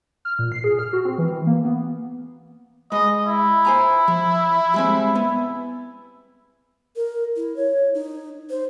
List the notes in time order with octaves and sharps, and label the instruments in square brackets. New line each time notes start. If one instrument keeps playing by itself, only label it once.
[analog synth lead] F6
A#2
C7
G#4
F6
F#4
C4
E3
E3
A#3
B3
[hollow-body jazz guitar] G#3 B5 [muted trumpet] D#5
[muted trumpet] E4
[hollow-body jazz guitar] C5 G#5 A#5
F3
G3 G#3 C4
B3
[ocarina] A#4
E4
C#5
D#4
C5